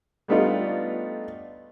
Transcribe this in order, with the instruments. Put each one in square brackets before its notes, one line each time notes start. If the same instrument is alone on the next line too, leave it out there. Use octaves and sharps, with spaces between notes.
[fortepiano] G3 A3 B3 D4 D#4 F4